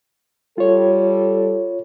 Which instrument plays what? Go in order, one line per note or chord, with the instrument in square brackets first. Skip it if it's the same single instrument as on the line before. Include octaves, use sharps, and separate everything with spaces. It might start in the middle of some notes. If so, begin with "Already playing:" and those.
[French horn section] G3 A4 [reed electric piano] F4 C#5